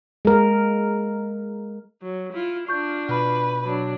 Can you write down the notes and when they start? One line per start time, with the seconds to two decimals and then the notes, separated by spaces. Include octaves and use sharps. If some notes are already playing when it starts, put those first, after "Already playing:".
0.25 G#3 A#4
2.02 F#3
2.33 E4 F4
2.68 D4 F4 C#6 G6
3.09 B2 B4
3.65 F#3 D4